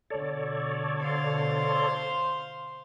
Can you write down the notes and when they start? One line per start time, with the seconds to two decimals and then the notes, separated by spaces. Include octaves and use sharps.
0.10 B2 D3 A4 C#5 D5
1.01 C5 F5 C6